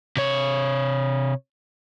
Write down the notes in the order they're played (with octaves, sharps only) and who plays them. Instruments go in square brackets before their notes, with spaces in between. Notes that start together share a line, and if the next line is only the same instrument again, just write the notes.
[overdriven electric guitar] C3 C#5